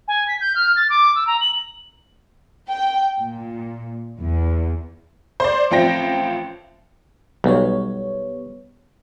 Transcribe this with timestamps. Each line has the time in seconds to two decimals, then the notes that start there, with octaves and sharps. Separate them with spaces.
0.08 G#5
0.28 B6
0.41 G6
0.55 F6
0.76 A6
0.90 D6
1.15 E6
1.27 A#5
1.41 F#7
2.67 G5
3.19 A#2
4.19 E2
5.40 C5 D5
5.71 A1 F3 C4 G5 A#6
7.44 B1 G3 B3 C#5